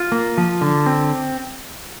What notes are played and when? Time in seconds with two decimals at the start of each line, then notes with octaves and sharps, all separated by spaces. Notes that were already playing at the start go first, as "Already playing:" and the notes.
Already playing: F4
0.12 A#3
0.37 F3
0.61 D3
0.86 C4